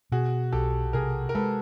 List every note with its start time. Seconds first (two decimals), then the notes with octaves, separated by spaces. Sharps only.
0.12 B2 F#4 G#4
0.52 B1 G4 A4
0.93 C3 G#4 A#4
1.29 A#4
1.35 G#3 A4 B4